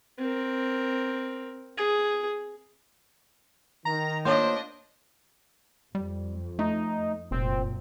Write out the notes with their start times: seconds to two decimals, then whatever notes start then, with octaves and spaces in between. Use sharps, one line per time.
0.19 C4 A#4
1.78 G#4
3.85 D#3 A#5
4.25 A#3 D4 F4 C5 C#5 D#5
5.95 F2 G3
6.59 A3 D#4
7.31 F1 F#2 A#2 C4